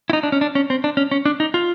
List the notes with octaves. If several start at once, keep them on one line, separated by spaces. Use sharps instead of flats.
E4
D#4
D4
C#4
D4
C#4
C4
D4
C#4
C#4
D4
D#4
F4